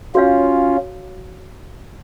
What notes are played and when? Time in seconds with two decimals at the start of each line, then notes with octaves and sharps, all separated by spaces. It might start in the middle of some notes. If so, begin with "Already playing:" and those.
0.15 C#4 F4 F#4 C#5 F5